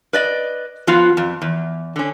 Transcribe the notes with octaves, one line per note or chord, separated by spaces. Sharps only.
B4 D5 D#5
F3 B3 F4 F#4
F2
E2
D3 C#4